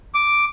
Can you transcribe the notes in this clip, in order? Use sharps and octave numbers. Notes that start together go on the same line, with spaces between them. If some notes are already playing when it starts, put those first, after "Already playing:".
D6